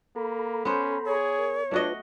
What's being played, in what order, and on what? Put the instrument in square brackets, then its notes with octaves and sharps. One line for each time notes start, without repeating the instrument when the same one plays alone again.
[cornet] A#3 [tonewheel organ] A4 A#5 B5
[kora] B3 C5 [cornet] C#4
[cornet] G#4 [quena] C#5
[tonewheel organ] A#4
[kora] A3 F#4 D#5 [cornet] D4 [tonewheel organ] F4 B4